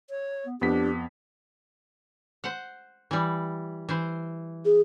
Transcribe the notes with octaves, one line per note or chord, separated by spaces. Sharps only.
C#5
B3
F2 B3 D4 G4 B6
C5 F#5
E3 G3
E3 C5
G#4